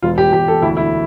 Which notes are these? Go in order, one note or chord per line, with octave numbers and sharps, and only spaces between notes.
E1 F4
G4
E1 G4
A4
D2 E4
E4